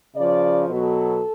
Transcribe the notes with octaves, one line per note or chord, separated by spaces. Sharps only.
C#3 F3 D5
B2 F#3 A4